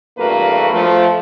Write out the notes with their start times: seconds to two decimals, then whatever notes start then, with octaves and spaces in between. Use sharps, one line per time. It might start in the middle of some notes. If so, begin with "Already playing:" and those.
0.19 E2 G2 A3 A#3 F#4 B4
0.72 F3 A3